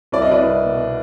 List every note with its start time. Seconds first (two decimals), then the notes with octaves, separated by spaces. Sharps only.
0.12 C2 D5
0.22 D#5
0.31 B4 D5
0.39 C2
0.65 B2